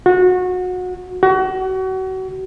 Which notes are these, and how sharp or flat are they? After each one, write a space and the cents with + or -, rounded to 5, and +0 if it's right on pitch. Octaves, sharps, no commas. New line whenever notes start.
F#4 -25
F#4 +30